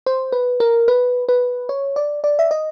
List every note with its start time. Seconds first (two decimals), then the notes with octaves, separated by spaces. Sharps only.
0.06 C5
0.32 B4
0.60 A#4
0.88 B4
1.29 B4
1.69 C#5
1.96 D5
2.24 D5
2.39 E5
2.51 D#5